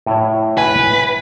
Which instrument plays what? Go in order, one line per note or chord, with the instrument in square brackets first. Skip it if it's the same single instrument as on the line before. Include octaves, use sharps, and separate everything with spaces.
[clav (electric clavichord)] A2 E4 C#5
[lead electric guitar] B4 [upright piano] G#5